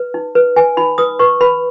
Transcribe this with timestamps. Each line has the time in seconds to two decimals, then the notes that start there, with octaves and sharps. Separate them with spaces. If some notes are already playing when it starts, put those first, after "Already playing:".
Already playing: B4
0.14 D#4
0.35 B4
0.56 B4 G#5
0.77 D#4 B5
0.98 B4 D#6
1.19 B4 C#6
1.41 B4 B5